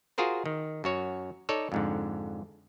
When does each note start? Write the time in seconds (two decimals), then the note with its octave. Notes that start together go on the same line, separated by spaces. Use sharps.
0.18 F4 F#4 G#4 A#4 C5
0.46 D#3
0.84 F#2 F#4 C#5
1.49 D#4 A4 C#5 D5
1.72 F2 G#2 D3